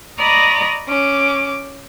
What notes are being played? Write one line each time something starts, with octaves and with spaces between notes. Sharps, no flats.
D5 D#5 A#5 B5 C#6 D#6
C#4 D6